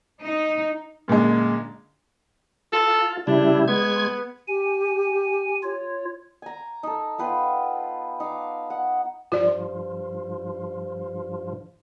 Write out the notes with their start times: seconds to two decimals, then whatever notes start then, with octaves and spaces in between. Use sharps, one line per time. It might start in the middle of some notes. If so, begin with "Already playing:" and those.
0.23 D#4
1.08 F#2 A#2 D3 G#3
2.73 F4 A4
3.27 C#3 G3 D4 E4
3.68 G#3 B3 G#6
4.48 G4 G#5
5.63 F4 C#5
6.42 G#5 A#5
6.83 D#4 A4
7.18 B3 F4 B4 G5
8.20 D#4 F5 D6
8.70 F#5
9.32 G2 F3 F4 D5